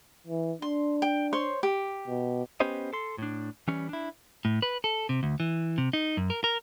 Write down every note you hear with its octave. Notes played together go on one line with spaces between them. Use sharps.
E3
D4 C6
G5
C5 C#5 C6
G4
B2
B3 C#4 G4 B4 C5 D#5
A4 C6
A2 D4
E3 G3 C#4
D4 E4
A2
B4
A4
C3
D2
E3
C3
D#4
F#2
A#4
A#4